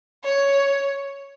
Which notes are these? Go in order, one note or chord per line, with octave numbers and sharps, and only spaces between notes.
C#5